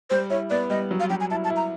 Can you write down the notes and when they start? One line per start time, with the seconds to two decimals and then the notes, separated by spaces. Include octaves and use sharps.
0.10 G3 C5
0.30 E4 C#5
0.50 B3 D5
0.70 G3 D#5
0.91 F#3
1.00 F5
1.10 F#3 G5
1.21 G#5
1.31 E4 A5
1.44 A5
1.50 E4
1.56 A#5